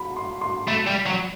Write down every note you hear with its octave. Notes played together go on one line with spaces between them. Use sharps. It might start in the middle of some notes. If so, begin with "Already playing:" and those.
Already playing: B5
C6
C6
A3 B5
G3
F#3